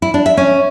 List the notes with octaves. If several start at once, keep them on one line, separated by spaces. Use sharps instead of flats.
E4
D4
E5
C#4